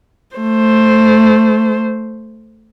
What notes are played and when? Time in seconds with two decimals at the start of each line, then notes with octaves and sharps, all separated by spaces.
0.37 A3 C5